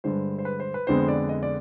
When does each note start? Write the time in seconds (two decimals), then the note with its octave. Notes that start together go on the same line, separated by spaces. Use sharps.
0.04 G2 D3 G#3 C5
0.38 C5
0.45 B4
0.60 C5
0.74 B4
0.87 F2 D3 G#3 B3 C5
1.08 D5
1.29 D#5
1.43 D5